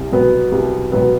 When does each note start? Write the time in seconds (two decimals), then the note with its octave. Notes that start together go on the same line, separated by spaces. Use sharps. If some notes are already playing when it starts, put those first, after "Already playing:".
Already playing: C2
0.12 B2 F#3 B3
0.52 C2
0.92 B2 F#3 B3